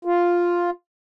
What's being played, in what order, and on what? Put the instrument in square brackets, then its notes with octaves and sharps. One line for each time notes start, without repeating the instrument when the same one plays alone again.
[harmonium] F4